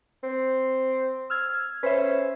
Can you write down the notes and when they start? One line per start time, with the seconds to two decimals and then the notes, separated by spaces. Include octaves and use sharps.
0.23 C4
1.30 E6 F6 G#6
1.83 C#4 B4 C5 E5